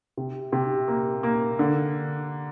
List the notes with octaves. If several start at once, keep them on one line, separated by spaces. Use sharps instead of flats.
C3
C3
A#3
A#3
D3